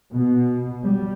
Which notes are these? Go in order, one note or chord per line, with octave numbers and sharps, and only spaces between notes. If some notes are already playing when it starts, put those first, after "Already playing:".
B2
G3